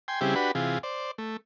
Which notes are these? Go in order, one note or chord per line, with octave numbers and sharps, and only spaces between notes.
G5 G#5 C6
C#3 G3 C4 E4 G4 G#4
D4 F#4 G4 B4 B5
C3 E3 F4 G#4
C5 D5
A3